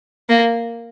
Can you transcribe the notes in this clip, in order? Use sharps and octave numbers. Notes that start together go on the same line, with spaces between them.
A#3